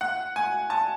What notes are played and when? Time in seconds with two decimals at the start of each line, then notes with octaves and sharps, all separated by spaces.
0.01 F#5
0.36 G#5
0.70 A5